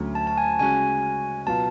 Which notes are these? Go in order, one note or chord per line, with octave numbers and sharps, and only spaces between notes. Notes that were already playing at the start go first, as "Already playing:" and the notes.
Already playing: D2 D3 F#3 A3 C#4
A5
A5
G#5
C#3 G#3 C#4 F#4 G#5
B2 F#3 B3 F4 A5